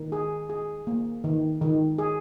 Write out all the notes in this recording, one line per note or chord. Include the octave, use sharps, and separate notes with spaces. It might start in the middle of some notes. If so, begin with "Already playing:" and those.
Already playing: D#3
G#4
G#4
A#3
D#3
D#3
G#4